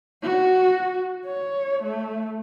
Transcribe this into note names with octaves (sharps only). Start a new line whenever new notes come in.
F#4
C#5
A3